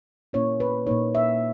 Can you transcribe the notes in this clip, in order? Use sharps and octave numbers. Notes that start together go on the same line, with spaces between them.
A#2 A#3 C#4 E4 C#5
B4
A#2 A#3 D#4 C#5
E5